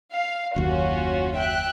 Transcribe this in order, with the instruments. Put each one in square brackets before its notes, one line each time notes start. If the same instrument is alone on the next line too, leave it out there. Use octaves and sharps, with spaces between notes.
[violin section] F5
[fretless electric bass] F#1 D#2 [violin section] C#4 F4 F#4
[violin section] E5 G5 F#6